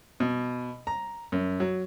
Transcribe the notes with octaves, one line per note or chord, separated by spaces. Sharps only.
B2
A#5
F#2
F#3